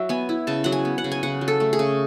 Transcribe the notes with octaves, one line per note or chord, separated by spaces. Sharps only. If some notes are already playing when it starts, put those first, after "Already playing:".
Already playing: F#3 E5
B3 G#5
E4
C#3 A5
F#3 F#5
G#5
B3
F#5
C#3
G#5
C#3 F#5
F#3
A4
A3
G#4
C#3